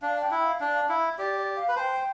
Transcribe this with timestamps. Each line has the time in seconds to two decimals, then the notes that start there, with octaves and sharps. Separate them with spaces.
0.02 D4 F5
0.21 G5
0.31 E4
0.41 G5
0.44 F5
0.61 D4
0.89 E4
1.18 G4 D5
1.37 D5
1.56 F5
1.68 B4
1.76 C5 G5 A5